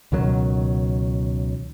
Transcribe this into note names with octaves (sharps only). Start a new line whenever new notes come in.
C#2 B2 D#3 F#3